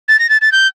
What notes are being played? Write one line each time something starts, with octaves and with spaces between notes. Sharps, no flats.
A6
A#6
A6
A6
G6